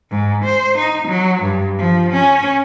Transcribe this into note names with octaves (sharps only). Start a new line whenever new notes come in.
G#2
C5
D#4
F#3
G2
F3
C#4